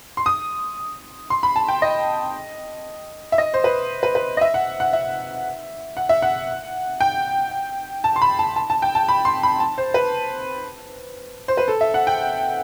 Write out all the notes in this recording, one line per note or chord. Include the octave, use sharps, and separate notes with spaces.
C6
D#6
C6
B5
A5
G5
D#5
E5
D#5
C5
B4
B4
B4
D#5
E5
F#5
F#5
E5
F#5
E5
F#5
G5
A5
C6
B5
A5
A5
A5
G5
A5
B5
C6
B5
A5
C5
B4
C5
B4
A4
E5
F#5
G5